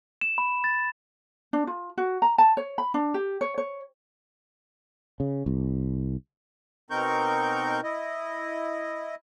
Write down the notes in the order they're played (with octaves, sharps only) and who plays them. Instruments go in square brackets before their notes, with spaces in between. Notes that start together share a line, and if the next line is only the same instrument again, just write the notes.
[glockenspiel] E7
B5
A6
[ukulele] D4
F4
F#4
A#5
A5
C#5
B5
D4
G4
C#5
C#5
[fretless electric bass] C#3
C2
[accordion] B2 C4 D#4 A#4 C#6 G6
E4 D#5